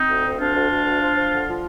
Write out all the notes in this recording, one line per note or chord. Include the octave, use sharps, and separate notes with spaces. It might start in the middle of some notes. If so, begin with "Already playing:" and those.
Already playing: C4 D#4
D2
D2
D2 D4 F4
D2
D2
D2
F3
F3
D3
F3